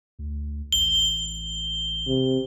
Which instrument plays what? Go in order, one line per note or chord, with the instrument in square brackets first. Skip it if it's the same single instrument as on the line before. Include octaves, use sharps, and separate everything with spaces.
[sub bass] D2
[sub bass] A1 [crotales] G7
[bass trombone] C3